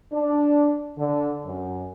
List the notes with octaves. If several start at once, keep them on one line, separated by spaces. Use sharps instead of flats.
D4
D3
F#2